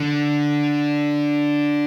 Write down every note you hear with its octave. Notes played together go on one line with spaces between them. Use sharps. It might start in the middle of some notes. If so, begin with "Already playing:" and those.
Already playing: D3